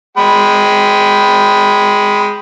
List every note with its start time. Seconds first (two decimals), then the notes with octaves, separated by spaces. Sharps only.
0.18 G#3 G5 B5